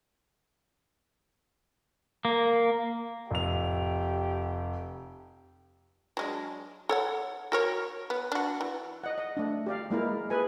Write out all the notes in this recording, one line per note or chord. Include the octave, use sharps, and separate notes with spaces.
A#3
F1 G4 F7
F#3 G#3 D4
A4 C#5 F#5
F#4 A#4 C#5
B3
D4 F#4
E3
D#5 F#5
D#5
A3 D4
G4 D5 F5
G#3 A#3 E4 A#4
G#4 A4 B4 G#5